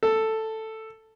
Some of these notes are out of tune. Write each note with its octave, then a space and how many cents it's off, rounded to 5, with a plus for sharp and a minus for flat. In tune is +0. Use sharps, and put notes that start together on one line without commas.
A4 +5